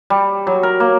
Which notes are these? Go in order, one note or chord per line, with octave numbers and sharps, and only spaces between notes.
G3
F#3
A#4
A#3